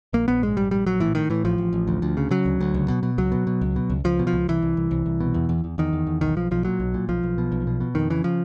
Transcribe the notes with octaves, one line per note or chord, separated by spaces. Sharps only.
A#1 A#3
A#1 B3
G#2 G#3
A#1 G3
A#1 G3
A#1 F#3
A2 E3
A2 D#3
A2 E3
A1 F3
A1
A1
D2
D2
C#3
C#3 F#3
D2
D2
C#2
B2
B2
C#2 F#3
B2
B2
C#2
B2
C#2
C#2 F3
B2
F3
C#2
C2 E3
C2
C2
C2
C2
B2
E2
E2
E2
E2 D#3
E2
E2
B1 D#3
B1 F3
B1 F3
A#2 F#3
B1
A#2
B1 F3
B1
B2
B1
B2
B2
F2 D#3
C#3 E3
F3